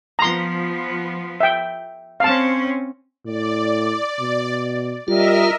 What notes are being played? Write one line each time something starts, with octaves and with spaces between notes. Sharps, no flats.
F3 B3 A#5 C6
E5 G5
C4 C#4 F5 A5
A2 D5
B2
G3 F4 A#4 D#5 E5